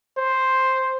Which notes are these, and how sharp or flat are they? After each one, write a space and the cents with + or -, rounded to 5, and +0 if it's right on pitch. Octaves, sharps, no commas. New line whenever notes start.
C5 +0